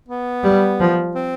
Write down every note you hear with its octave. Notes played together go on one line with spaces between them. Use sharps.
B3
G3
F3
C4